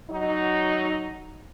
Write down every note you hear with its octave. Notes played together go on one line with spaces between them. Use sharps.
F#3 D#4